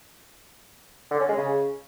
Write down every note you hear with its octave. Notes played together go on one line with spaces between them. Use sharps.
D3
C#4
G#3
C#3